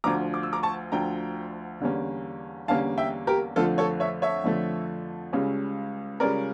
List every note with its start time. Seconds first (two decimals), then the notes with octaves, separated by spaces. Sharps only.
0.04 D2 D3 F3 A#5 D6
0.34 D6
0.43 E6
0.53 A#5 D6
0.63 A5 C#6
0.92 D2 D3 F3 G5 A#5
1.81 E2 D3 G3 A#3 C#4
2.68 E2 D3 G3 A#3 C#4 F5 A5
2.98 E5 G5
3.27 G4 A#4
3.56 F2 D3 F3 A3 F4 A4
3.78 A4 C#5
4.00 C#5 E5
4.22 C#5 E5
4.44 F2 D3 F3 A3
5.33 C#2 C#3 G3 C#4
6.20 C#2 C#3 G3 C#4 A#4 D5